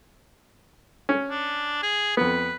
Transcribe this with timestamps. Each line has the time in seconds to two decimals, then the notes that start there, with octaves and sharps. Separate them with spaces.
1.09 C#4
1.30 D4
1.83 G#4
2.17 F2 B3 B4